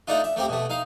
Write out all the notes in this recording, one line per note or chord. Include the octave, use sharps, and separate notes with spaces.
A3 D4 D#4 F4
E5
A3 A#3 C4 G4
B2 A3
D#4 F5